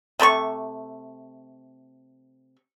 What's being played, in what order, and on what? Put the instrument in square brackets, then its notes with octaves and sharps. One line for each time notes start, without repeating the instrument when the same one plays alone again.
[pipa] C3 A3 B5 C#6